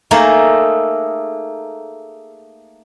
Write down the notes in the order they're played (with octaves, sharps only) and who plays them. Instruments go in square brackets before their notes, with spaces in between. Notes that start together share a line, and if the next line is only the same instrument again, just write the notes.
[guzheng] A3 A#3 D#4 G#4 A4